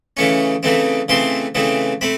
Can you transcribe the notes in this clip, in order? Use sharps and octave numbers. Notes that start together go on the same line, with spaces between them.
C#3 E3 A3 C#4 C#6
C#3 E3 A3 C4
C#3 E3 A3 C4 C6
C#3 E3 A3 C4
A3 C4 B5